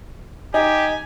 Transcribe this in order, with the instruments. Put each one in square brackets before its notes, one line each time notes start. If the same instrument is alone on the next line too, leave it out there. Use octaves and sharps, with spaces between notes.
[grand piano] D#4 [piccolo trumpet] G4 [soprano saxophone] G#5